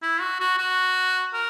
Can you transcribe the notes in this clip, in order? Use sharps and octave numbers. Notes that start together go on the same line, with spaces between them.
E4
F#4
F#4
F#4
A#4